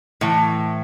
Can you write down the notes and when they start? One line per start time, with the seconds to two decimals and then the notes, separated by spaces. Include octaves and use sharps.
0.21 A2 E3